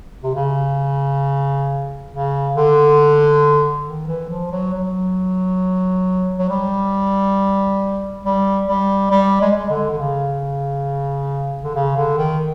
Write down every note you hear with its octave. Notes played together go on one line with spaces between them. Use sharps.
C3
C#3
C#3
D3
D#3
E3
F3
F#3
F#3
F#3
G3
G3
G3
G3
G#3
G#3
D3
D3
C#3
D3
C#3
D3
D#3